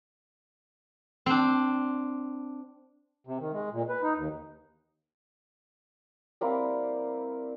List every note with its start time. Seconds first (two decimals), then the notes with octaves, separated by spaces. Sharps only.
1.26 C4 D4
3.27 C3
3.39 D#3
3.53 G#3
3.72 A#2
3.89 B4
4.03 D#4
4.16 D#2
6.41 G3 A#3 C4 E4